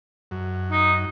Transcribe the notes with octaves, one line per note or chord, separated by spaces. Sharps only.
F#2
D#4